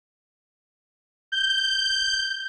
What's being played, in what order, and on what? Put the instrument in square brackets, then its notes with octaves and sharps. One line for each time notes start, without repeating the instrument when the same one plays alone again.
[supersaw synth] G6